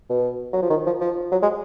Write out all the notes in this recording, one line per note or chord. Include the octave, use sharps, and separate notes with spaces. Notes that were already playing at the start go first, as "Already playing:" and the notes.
B2
F#3
F3
D#3
F3
F3
F#3
G#3